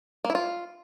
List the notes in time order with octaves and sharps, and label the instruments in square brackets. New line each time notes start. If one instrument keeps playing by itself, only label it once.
[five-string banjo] A#3
E4
F4